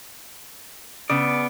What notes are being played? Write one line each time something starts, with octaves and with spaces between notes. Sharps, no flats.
C#3 B3 D5